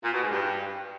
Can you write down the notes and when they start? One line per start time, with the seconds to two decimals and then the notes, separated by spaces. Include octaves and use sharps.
0.03 A#2
0.12 B2
0.22 G#2
0.31 G2